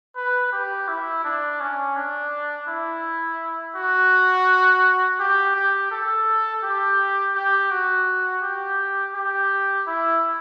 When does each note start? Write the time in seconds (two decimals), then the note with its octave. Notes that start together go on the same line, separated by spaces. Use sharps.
0.16 B4
0.53 G4
0.88 E4
1.25 D4
1.60 C#4
1.96 D4
2.68 E4
3.76 F#4
5.19 G4
5.55 G4
5.91 A4
6.63 G4
7.35 G4
7.71 F#4
8.43 G4
9.15 G4
9.87 E4